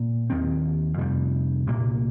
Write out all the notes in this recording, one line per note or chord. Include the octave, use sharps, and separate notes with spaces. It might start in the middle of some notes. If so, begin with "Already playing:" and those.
Already playing: A#2 A#3
D#2 D#3 C4
F2 C3 G3
C2 A#2 A#3